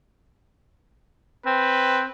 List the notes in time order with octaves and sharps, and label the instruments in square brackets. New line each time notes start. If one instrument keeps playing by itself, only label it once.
[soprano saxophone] C4 [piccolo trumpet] B4